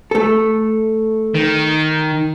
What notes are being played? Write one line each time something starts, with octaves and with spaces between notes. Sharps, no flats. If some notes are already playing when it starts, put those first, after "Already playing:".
A3 A4
D#3